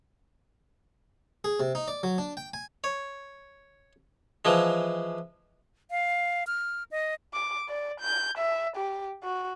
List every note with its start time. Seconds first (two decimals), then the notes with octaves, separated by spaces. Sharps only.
1.44 G#4
1.60 C3
1.75 D#4
1.88 D5
2.03 F#3
2.18 D4
2.37 G5
2.54 G#5
2.84 C#5
4.45 E3 F3 G#3
5.91 F5
6.47 F6
6.91 D#5
7.33 D6
7.69 D5
8.00 G6
8.38 E5
8.76 G4
9.23 F#4